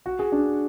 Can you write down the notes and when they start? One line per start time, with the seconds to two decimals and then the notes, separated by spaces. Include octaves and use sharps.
0.06 F#4
0.19 G#4
0.32 D4 F#4